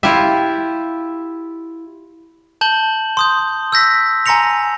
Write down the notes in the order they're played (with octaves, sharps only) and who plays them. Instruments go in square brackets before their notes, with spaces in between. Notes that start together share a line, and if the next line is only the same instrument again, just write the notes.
[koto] E4 F4 G4 E5
[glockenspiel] A5 G6 F#7 G7
C6 D#6 G6
E6 G6 A#6 B6
G#5 A#5 C6 A#6 C#7 F7